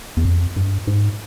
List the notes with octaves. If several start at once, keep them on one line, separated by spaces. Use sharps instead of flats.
E2
F2
G2
G#2